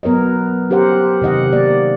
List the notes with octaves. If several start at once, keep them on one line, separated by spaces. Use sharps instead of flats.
F#3 B3 A#4 C#5 D#5
C#4 G4 A#4 C5 F#5
C3 D#3 D#5 F#5
A#3 D5